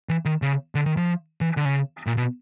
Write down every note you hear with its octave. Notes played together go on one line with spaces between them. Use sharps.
E3
D#3
C#3
D3
D#3
F3
E3
D3
C#3
A#2
B2